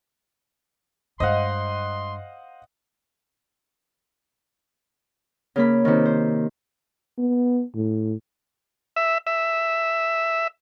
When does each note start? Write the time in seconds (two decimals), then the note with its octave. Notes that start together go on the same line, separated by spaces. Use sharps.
1.20 G2 G#3 C5 D#5 F5 F#5 C6
5.56 C#3 A#3 B5
5.85 C3 D#3
6.05 C5
7.18 B3
7.75 A2
8.96 E5
9.27 E5